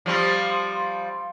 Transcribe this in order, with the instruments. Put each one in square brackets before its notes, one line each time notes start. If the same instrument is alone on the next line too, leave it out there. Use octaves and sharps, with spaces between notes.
[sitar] F3 G3 C4